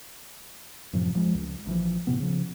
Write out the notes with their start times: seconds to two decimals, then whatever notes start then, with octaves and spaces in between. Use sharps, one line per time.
0.93 F#2 A2 C3 F3
1.14 D1 F3 G#3
1.34 C#2
1.66 A#1 E3 F3
2.07 A2 C3 B3
2.20 C#3 F3